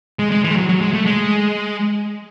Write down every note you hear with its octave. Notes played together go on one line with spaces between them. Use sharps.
G#3
G#3
E3
G#3
F#3
F#3
G#3
A3
G#3